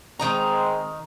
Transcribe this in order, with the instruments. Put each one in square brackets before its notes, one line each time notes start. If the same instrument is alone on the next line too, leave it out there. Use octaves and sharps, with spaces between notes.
[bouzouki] D#3 D#4 A#5 [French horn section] G#3 C4